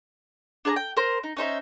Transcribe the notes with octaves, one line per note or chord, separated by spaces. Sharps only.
D4 G#4 A5 A#5
G5
A#4 C5
D#4
C#4 D#4 C5 E5